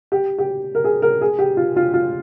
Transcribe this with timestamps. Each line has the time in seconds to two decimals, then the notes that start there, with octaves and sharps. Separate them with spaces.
0.12 G4
0.38 G4
0.75 A#4
0.84 G#4
1.02 A#4
1.21 G#4
1.39 G4
1.57 F4
1.76 F4
1.94 F4